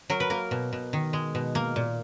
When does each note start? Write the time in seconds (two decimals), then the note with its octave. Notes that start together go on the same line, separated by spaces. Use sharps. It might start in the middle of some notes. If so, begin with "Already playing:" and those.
0.10 F#3 A#4
0.20 B4
0.30 A#3 A#4
0.51 B2
0.73 B2
0.93 D#3
1.13 G#3
1.35 B2
1.55 A#3
1.76 A#2